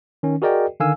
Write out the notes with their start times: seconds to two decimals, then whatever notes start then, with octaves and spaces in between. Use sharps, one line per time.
0.23 D#3 C#4
0.42 F#4 G#4 A#4 D5 D#5 G5
0.80 D3 D#3 F5 G#5 E6